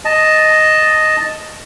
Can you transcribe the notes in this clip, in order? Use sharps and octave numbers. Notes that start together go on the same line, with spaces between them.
D#5 A5